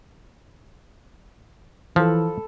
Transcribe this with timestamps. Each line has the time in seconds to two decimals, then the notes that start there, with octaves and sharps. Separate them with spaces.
1.96 E3 F3 A4 B5